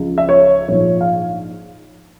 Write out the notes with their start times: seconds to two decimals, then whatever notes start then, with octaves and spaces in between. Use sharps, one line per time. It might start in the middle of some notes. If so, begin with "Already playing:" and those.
Already playing: C#2 C#3 F3
0.18 E5
0.29 C#5
0.68 A#1 G#2 F3 C#5
1.01 F5